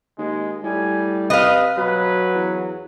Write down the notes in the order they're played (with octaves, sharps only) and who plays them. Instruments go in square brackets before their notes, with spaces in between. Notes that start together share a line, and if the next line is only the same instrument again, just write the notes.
[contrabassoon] D#2 [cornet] G#3
[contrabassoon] A2 [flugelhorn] G3 [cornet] G#5
[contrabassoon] C3 [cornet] B4 [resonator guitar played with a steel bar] D#5 F5
[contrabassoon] B2 [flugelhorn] F#3 [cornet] B4
[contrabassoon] E2